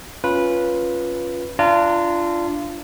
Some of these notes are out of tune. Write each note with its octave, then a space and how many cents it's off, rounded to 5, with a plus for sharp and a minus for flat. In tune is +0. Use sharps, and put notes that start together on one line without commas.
C#4 -5 F4 +0 B4 -10
D4 +0 F4 -25 A#5 -30